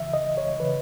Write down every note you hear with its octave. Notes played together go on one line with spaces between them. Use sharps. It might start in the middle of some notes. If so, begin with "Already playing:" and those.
Already playing: C#2 C#3 E3 E5
D#5
C#5
C#3 E3 B4